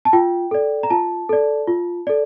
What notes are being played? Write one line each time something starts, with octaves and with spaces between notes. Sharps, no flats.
A5
F4 G5
A4 D5
A#5
F4 A5
A4 D5
F4
A4 D5